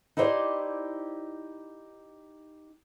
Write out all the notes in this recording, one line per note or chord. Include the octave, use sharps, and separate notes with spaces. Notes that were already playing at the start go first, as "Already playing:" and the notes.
D#4 E4 G4 C5 D5